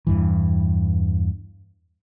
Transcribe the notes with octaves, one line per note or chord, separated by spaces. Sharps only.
E2 G2 E3